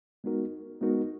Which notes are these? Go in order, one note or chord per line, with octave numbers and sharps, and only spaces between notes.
G#3 B3 D#4 F#4 A#4
G#3 B3 D#4 F#4 A#4